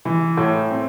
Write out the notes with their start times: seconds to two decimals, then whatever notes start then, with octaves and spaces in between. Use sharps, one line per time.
0.05 E3
0.37 A2
0.71 C4